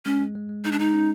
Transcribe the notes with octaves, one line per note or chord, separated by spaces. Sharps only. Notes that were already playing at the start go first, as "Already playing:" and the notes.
G#3 C#4
G#3
G#3
G#3
G#3 D#4
D4
G#3 D#4
C#4